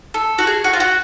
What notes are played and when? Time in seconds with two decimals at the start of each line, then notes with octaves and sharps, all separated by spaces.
0.14 A4
0.38 F#4
0.47 G#4
0.64 F#4
0.73 F4
0.80 F#4